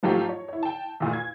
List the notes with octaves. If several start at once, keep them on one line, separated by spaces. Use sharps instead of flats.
G#2 F3 F#3 A3 G4
C#5
E4 C#5
G5 A5
E2 A#2 A3
G#6